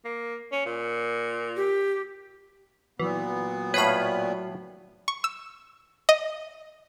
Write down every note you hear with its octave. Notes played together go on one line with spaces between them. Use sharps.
A#3
C#4
A#2
G4
A#2 E3 F#3 B3
A2 B4 C#5 F5 B5
C#6
E6
D#5